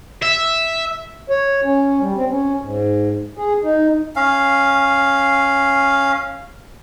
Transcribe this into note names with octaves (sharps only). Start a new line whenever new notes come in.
E5
C#5
C#4
G3
C4
C#4
G#2
G#4
D#4
C#4 F5